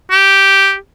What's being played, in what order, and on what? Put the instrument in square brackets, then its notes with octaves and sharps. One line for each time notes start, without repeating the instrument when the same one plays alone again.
[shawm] G4